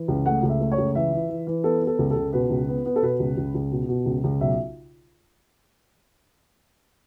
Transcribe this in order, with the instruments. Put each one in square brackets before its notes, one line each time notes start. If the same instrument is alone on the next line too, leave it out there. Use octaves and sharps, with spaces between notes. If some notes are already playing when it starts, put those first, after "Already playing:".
Already playing: [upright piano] E3
C#2
A3 F#5
C#2
E5
A3
C#5
C#2
E3 E5
E3
E3
E3
B3 A4
B3
A4
C#2
A4
C#2
B2 B4
C#2
B3
B3
A4
B2 B4
C#2
C#2
C#2
B2
B2
C#2
C#2
B1 E5